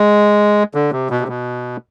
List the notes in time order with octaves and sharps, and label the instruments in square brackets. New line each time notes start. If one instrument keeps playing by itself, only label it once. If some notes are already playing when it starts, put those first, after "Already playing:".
Already playing: [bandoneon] G#3
D3
C3
B2
C3
B2